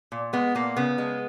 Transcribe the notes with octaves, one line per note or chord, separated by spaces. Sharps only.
A#2
G#3 B3
A#2 A#3
C#3 B3
G#3